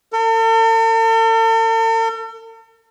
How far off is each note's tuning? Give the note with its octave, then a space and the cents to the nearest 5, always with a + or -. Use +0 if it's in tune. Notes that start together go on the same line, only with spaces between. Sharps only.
A4 +45